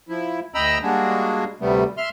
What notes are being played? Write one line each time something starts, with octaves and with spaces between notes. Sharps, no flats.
F3 E4
D2 D#5 G5 A#5 B5 E6
G3 G#3 A#3 D4 F#4 G#4
D2 C3 G3 A3 B3
E5 C6 F6